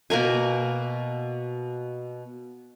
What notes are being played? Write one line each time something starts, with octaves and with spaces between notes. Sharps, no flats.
B2 A#3 A#4 G#5